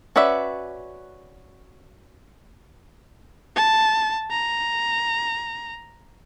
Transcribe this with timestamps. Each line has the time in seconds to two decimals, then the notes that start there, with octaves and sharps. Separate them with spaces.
0.16 C#4 F#4 B4 D5 E5
3.56 A5
4.31 A#5